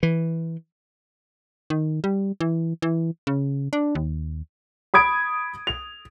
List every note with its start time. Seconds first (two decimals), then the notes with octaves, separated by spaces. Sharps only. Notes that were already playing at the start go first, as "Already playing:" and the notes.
0.03 E3
1.70 D#3
2.04 G3
2.41 E3
2.82 E3
3.27 C#3
3.73 D4
3.95 D#2
4.94 B5 D#6 G#6 D7
5.67 F7